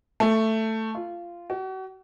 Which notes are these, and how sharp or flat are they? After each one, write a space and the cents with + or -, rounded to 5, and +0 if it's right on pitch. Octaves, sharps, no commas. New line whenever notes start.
A3 +10
F4 -15
F#4 +40